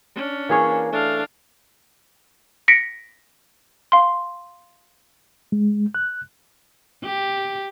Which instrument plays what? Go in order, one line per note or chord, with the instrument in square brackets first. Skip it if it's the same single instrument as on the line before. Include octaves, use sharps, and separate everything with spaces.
[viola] C#4 D4
[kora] E3 G#4 C#5 [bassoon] A#3
[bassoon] A3 [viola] D4 F5
[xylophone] A#6 B6 C#7 D7
F5 C6
[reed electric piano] G#3
F#6
[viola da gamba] G4